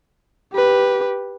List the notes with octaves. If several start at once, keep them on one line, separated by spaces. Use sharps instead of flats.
G4 B4